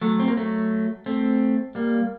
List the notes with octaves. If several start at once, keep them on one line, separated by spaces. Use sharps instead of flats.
F#3 A3
C4
A#3
F#3 A3
A3 C4
G3 A#3